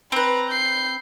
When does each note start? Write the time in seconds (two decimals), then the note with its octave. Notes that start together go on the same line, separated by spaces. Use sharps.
0.12 C4 B4 A#5 B5
0.49 G6 C7